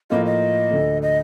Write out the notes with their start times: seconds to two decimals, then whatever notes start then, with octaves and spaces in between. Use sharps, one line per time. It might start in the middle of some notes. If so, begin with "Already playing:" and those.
0.10 A2 F3 A#3 F4 D#5
0.26 D#5
0.71 D2 D3 A3
1.02 D#5